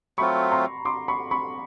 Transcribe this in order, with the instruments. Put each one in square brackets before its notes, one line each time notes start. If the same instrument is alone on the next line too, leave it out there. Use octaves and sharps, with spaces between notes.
[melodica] F#3 A3 C4 F4 [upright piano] B5 C#6
[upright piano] A#5 C6
C6 D6
B5 C#6
B5 C#6